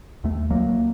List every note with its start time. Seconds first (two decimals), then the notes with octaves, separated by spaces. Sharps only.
0.24 D#2 A3
0.50 C#2 F#3 A#3